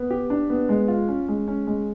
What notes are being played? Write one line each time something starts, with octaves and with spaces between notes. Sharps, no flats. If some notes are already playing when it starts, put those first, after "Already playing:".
Already playing: B3
G4
D4
B3
G#3
F4
C#4
G#3
C#4
G#3